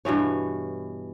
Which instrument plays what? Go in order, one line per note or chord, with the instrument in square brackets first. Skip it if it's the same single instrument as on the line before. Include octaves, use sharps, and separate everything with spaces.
[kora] G2 B2 E3 C#5